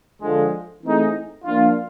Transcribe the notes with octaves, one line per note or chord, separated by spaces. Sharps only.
D3 F3 G#3
E3 A3 C4 D#4 G#4
F3 A#3 D4 F4